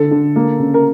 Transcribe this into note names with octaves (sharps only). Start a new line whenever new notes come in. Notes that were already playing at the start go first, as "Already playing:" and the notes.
Already playing: D3 A4
D3
A#3
C#3
A#4